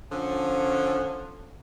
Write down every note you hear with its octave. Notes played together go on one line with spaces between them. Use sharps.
D3 F3 C#4